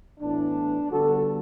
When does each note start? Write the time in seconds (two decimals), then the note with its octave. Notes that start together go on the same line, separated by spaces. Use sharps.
0.20 A2 E3 B3 D4
0.90 D3 G3 B3 F#4 A4